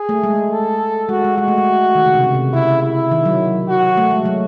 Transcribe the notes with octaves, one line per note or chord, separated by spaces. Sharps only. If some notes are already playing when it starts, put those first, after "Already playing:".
Already playing: G#4
A3
G#3
A4
G#3 F#4
G#3
G#3 F#4
A3
G#3
D#3
C#3
C3
C#3
C3
C#3 E4
E4
D#3
F#3
F#4
A3
G#3
F#3